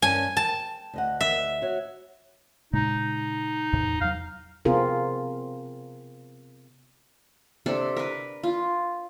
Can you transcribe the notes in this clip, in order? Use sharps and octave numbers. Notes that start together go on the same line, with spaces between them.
G2 C#4 G#5 A5
G5 A5
D2 D#5 F#5
E5
F#4 C#5
A#2 C#3 G#3 D#4
E2 A2 C3
E2 F#3 F5
C3 B3 C4 F4 G#4 A#4
C3 D4 A4 D5
A#4 B4
F4